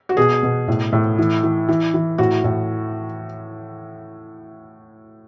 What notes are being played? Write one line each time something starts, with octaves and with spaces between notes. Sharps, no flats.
F#4
B2 G#4
B2
A2
A2
E3
E3
E3
E3
A2 F#4
A2